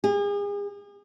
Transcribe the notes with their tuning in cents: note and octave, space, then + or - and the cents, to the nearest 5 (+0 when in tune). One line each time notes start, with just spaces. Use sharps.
G#4 -40